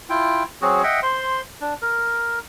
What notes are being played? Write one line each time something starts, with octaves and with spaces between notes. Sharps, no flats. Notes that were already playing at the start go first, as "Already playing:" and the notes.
E4 F4 G5
F#3 C4 F#4 G#4
D#5 E5 F#5 G5
C5 C6
D4
A#4